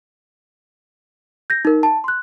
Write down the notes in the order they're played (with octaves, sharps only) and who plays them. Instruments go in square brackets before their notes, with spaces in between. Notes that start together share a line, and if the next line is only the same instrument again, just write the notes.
[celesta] G6 A#6
D#4 A#4
A5
C6 F#6